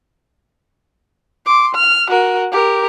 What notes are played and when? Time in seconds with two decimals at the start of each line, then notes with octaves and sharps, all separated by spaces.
1.46 C6 D6
1.75 F6
2.09 F#4 A#4
2.52 G4 A#4